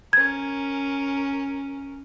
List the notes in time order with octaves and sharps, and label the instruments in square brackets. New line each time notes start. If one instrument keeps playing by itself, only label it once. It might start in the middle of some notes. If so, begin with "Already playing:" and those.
[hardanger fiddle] C#4 A#4 [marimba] G#6